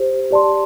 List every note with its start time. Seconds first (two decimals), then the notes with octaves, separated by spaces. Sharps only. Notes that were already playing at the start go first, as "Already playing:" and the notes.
Already playing: G4 C5
0.31 G4 D5 A5 C6